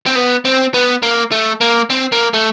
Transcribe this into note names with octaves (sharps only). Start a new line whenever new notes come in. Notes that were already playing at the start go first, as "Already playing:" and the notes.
C4
B3
C4
B3
A#3
A3
A#3
C4
A#3
A3